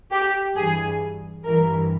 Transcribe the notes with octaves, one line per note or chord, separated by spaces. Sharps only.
G4
G2 E3 G#4
G2 E3 A#4